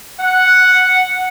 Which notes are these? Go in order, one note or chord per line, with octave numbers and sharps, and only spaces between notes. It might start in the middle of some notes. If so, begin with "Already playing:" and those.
F#5